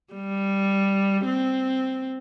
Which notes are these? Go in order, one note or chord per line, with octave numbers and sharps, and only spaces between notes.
G3
C4